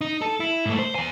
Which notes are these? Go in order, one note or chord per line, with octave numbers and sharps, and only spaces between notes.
D#4
A4
E4
G#2 A3
C5
E2 G#5